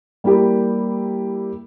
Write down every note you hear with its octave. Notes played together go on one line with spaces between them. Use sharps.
G3 A#3 E4 G4